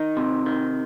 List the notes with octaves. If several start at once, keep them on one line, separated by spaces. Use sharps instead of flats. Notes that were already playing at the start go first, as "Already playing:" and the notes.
Already playing: D#3 D#4
C3
D#3